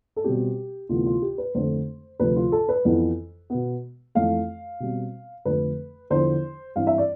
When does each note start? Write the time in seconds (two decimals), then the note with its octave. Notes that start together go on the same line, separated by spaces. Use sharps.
0.16 A4
0.24 B2 G3 C4 G4
0.89 D2 C3 E3 B3 F4
1.06 F4
1.22 G4
1.38 B4
1.55 F2 D3 A3 C4 C5
2.20 D2 C3 F3 B4
2.36 F4
2.52 A4
2.69 B4
2.85 F2 E3 B3
3.50 B2 B3
4.15 F2 E3 A3 F5
4.80 B2 G3 C4
5.45 F2 D3 F3 A3 B4
6.10 E2 D3 F3 C5
6.76 G2 E3 G3 C4 F5
6.87 E5
6.98 D5